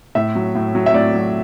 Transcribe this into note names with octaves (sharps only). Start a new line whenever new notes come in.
A2 E5
F#3
A2
F#3
E5
A2 D5
F#3